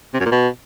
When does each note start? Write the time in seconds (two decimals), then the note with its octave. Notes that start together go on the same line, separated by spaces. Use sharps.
0.14 C3
0.20 F#2
0.26 A#2
0.32 B2